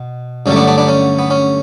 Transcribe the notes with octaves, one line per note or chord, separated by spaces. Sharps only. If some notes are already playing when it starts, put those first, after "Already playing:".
Already playing: B2
G2 D3 F#3 A3 C#4
B3 D4
B3 D4
B3 D4
C#4
B3
C#4